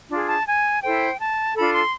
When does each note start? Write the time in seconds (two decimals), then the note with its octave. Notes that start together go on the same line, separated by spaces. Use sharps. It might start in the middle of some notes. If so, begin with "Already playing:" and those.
0.10 D4 F4 G#4
0.28 A5
0.47 G#5
0.82 E4 A4 C5 G5
1.19 A5
1.56 D4 F4 A4 B5
1.73 C6